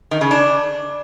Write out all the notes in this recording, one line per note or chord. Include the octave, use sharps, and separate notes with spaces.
D#3
C#3
D4